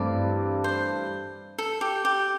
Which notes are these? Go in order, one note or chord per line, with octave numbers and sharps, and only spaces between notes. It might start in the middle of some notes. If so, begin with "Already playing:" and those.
Already playing: G2 E3 A3 C4 E4 D5
C5
A4
G4
G4